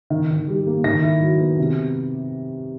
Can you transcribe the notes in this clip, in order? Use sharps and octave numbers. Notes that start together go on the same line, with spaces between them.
D#3
D#3
G3
A#3
D#3 A#6
E4
F#3
B3
C3